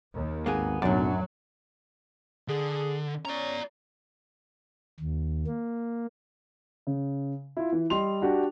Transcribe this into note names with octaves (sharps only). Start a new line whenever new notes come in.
D#2
G#1 A#3 B3 G#4
B1 F#2 A2 F#3 D4 D5
D3 G#4
C#4 D5 A#5
D#2
A#3
C#3
E4 F4
E3
G3 D#5 C6 F7
D4 F#4 G4